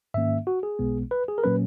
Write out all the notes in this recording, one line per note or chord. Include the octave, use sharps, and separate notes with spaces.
G#2 D#3 A#3 C#4 E5
F#4
G#4
B1 B2 G#3 B3
B4
G#4
A#4
A#2 F#3 A#3 C#4 B4